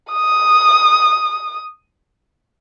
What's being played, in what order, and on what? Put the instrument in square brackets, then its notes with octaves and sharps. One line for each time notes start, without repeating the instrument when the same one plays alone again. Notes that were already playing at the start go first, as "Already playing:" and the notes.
[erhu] D#6